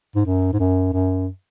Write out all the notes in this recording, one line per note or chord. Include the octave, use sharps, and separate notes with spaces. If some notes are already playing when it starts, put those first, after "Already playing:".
G#2
F#2
G#2
F#2
F#2